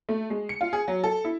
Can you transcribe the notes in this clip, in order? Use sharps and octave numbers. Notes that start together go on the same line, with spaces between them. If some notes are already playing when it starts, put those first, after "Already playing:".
A3
G#3
C#7
F4
G#4
F#3
A4
E4